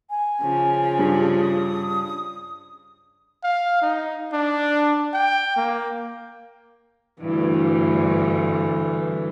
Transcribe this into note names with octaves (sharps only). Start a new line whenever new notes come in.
G#5
C#3 F3
G2
D#6
F5
D#4
D4
G5
A#3
D2 G2 E3